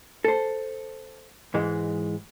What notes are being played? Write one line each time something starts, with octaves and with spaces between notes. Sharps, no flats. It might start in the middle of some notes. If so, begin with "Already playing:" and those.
A4 C5
G#2 E3 G#3